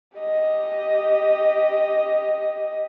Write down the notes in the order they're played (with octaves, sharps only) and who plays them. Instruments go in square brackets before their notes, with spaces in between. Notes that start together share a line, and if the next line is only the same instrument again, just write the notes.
[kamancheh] G4 D#5